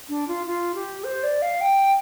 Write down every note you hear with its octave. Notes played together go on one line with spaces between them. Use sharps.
D4
F4
F4
G4
C5
D5
F5
G5